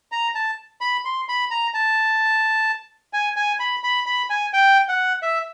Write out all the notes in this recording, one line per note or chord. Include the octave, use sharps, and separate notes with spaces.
A#5
A5
B5
C6
B5
A#5
A5
G#5
G#5
B5
B5
B5
G#5
G5
F#5
E5